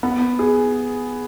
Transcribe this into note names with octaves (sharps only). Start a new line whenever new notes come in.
B3
G#4